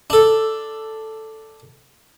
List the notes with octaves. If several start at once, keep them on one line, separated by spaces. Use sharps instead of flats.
D4 A4